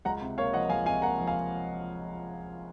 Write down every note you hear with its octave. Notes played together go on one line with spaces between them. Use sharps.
C#2 F#5 A#5
C3
A#3 C#5 F5
F3 D#5 F#5
C#2 F5 G#5
C3 F5 G#5
A#3 F#5 A#5
F3
F5 G#5